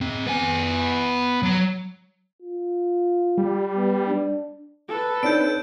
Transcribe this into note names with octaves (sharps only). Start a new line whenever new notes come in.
C4 G#4
B3 G#5
F#3 A#5
F4
G3
B3
D4
A4 B4
C4 D4 D#4 C#5 D5 G6 D7